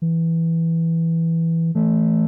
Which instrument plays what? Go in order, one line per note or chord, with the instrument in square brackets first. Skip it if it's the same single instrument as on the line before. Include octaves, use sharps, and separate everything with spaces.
[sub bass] E3
[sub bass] E3 [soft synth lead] A3